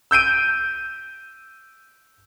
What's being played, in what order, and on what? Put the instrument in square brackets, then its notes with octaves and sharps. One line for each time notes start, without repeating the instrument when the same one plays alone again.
[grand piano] E6 G6 D7 D#7